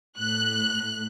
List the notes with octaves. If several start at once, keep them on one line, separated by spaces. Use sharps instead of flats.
A2 F#6